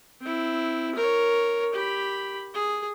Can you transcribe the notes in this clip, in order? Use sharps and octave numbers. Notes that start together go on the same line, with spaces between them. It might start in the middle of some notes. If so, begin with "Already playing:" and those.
C4 E4
A#4 C#5
G4 B5
G#4